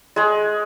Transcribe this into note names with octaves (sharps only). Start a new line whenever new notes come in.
G#3 G#4